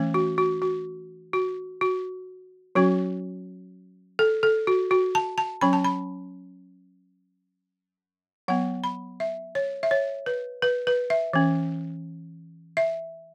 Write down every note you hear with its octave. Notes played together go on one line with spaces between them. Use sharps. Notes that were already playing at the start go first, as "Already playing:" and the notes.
Already playing: E3 A3 C#4
F#4
F#4
F#4
F#4
F#4
F#3 C#4 F#4
A4
A4
F#4
F#4
A5
A5
F#3 C#4 B5
A5
B5
F#3 B3 F#5
B5
E5
C#5
E5
C#5
B4
B4
B4
E5
E3 C#4
E5